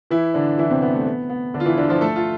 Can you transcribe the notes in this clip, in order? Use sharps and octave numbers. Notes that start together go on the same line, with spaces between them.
E3 E4
D3 D4
E3 E4
C3 C4
B3
A3
B3
B3
D3 D4
F4
E3 E4
D3 D4
F3 F4
A3 A4
F4